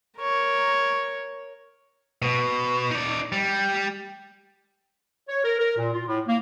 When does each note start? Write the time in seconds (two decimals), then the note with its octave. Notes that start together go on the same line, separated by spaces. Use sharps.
0.20 A#4 C#5
2.22 B2
2.91 D#4 D5
3.32 G3
5.29 C#5
5.45 A#4
5.59 A#4
5.77 A#2
5.93 F4
6.06 A2
6.28 A#3